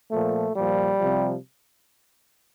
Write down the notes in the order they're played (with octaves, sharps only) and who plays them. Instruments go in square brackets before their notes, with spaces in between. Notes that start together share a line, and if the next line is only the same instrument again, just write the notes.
[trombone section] A#2 F3 A3
A#2 F3 G3
C3 F3